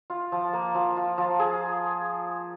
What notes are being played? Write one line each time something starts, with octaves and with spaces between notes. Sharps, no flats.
F4
F3
A#3
F3
F4
F3
G#4